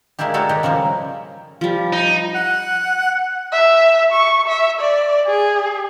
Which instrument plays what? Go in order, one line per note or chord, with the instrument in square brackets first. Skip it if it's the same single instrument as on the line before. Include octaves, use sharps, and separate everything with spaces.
[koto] G#3 A#3 D4 E4 G4
G3 G#3 F#4 A4 C#5
D#3 G4 D#5
C#3 F3 G3 A#3
[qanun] F3 G3
[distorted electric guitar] D#4
[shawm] F#5
[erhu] E5
C#6
E5
D5
G#4